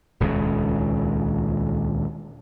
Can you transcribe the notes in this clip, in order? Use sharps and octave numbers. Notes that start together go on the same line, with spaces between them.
D#1 C#2 C#3